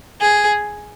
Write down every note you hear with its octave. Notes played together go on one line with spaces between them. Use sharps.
G#4